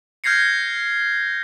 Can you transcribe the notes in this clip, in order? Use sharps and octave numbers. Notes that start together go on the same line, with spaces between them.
F6 G6 G#6 A#6 C7 C#7